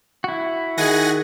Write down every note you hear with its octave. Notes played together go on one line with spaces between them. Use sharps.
E4 F#4
D#3 G#4 F#5 G#5 A#6